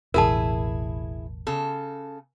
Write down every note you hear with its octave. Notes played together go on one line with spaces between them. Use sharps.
E1 A1 E4 G#4 A#4 A5
C#3 A4